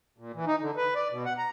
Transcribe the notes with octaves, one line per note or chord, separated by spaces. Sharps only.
A#2
E3
D#4
D3
B4
D5
B2
F#5
A#5